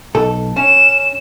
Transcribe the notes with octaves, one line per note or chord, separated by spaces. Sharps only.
B1 A4
C#4 E7